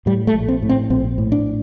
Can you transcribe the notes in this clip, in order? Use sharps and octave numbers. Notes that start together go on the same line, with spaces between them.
A2 G3
A3
A#1
C4
A2
C4
A#1 C4
A2
D4